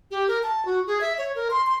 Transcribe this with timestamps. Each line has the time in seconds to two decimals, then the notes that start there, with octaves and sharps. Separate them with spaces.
0.11 G4
0.28 A#4
0.43 A5
0.65 F#4
0.87 G#4
1.01 E5
1.18 C#5
1.35 A#4
1.50 C6
1.67 C6